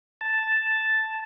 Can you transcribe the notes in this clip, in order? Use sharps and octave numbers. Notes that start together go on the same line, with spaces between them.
A5